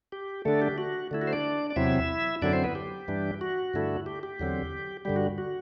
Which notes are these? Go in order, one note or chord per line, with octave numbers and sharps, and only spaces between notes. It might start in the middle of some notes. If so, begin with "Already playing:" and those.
G4
D3 A3 D4 A4
G4
F#4
D3 A3 E4
F#4
C5
D4 D5
D5
E2 C3 F#3 C4 E4 E5
F#2 D3 F#3 C4 D4 E4 D5
C4 C5
B3 B4
G4
G2 E3 G3 D4
F#4
G2 D3 A3 E4
G4
G4
E2 D3 F#3 C4
G2 D3 G3 G4
F#4
F#4